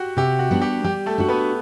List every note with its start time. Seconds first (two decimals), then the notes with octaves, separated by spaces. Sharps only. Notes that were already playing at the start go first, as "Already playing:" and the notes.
Already playing: F#4 G4 F#5
0.17 C3 G4
0.39 F#4
0.51 G3 B3 D4
0.62 G4
0.84 G3 G4
1.06 A3 A4
1.18 D4 F#4
1.29 B3 B4